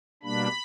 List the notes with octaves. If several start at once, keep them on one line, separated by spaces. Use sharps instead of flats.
B2 G3 A#3 D4 B5